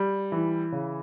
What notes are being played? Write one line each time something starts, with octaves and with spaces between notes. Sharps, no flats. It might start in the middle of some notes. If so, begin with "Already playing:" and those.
Already playing: G3
E3
C#3